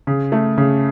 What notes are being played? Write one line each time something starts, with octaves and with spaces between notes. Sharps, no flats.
C#3
A3
C#3